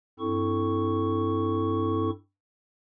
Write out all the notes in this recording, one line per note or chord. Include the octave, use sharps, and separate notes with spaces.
G2 C4 E4 A4 C#6